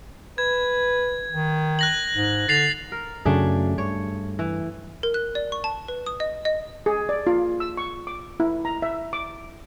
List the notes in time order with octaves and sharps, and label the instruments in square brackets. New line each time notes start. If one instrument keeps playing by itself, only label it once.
[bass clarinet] B4 [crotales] G#6
[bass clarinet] D#3
[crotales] F#6 A#6 F#7
[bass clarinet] G#2
[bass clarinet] D3 [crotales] A6 C7 F7
[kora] A#4
[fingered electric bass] F#2 C#3 F#3 [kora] A3 D4 G#4
[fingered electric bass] G2 [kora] C#5
[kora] E3
[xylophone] A#4
F#6
D5
C#6
A5
B4
D#6
D#5
D#5
[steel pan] G#4
D5
F4
E6
C#6
D6
E4
A#5
E5
D6